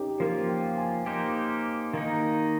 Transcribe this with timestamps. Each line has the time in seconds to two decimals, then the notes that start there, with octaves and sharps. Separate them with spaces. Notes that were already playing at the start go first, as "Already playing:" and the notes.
Already playing: C#4 D#4 G4
0.20 F3 A#3 F4 A#4
0.49 G5
0.78 G#5
1.06 A#3 D#4 G4 C5
1.93 D#3 A#3 D#4